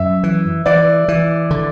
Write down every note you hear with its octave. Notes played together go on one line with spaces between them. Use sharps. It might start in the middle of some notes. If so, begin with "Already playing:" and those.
Already playing: F#2 E5
E3
E3 D5
E3
D3